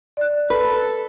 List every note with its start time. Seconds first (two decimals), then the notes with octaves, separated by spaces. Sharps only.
0.17 D5 F#6
0.50 A4 B4